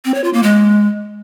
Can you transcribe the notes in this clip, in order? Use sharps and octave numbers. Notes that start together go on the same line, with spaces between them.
C4
C#5
F4
A#3
G#3